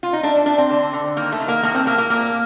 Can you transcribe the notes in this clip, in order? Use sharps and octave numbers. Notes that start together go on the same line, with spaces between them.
F4
D#4
A3 D4
D4
A3 D4
C4
D3
D3
D#3 A#3
A3
D#3
A#3
A2 A#3
C4
A2 A#3
A#3
A#2 A#3